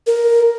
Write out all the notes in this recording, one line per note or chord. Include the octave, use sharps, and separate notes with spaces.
A#4